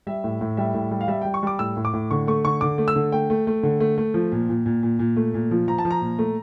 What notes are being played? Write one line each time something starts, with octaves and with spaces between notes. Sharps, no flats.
G3 E5
A2
A2
G3 E5
A2
G3
F5
G3 E5
G3 G5
C#6
G3 D6
A2 E6
A2
D6
A2
D3 C#6
A3 C#6
D3 C#6
D3 D6
A3
E6
D3
A3 G5
A3
A3
D3
A3
A3
F3
A#2
A#2
A#2
A#2
A#2
A3
A#2
F3
F3 A#5
A5
F3
A#5
A#2
A3